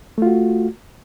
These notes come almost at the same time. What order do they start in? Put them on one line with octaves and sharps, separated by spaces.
A3 F4 F#4